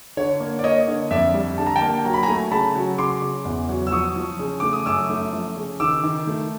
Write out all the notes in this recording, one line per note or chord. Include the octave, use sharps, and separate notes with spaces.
D3 C#5
A#3
D5
A#3 C#5 D#5
D3
F2 D5 E5
G3
D3 A5
A#5
G5 A5
A#3
F#3 A#5
B5
G#5 A#5
A3
C#3 A5 B5
F#3
C#3 C6 D6
C#3
E2
F#3
E6
F3 C#6 D#6
F3
C#3
A3 D6
D#6
F#2 D6 E6
A3
F3
C#3
D#3 D6 E6
D#3
A3